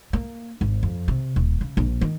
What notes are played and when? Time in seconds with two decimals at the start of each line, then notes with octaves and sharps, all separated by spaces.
0.13 A#3
0.61 G#1
0.83 F2
1.08 C3
1.36 D#1
1.61 C#3
1.77 A#1
2.01 D#3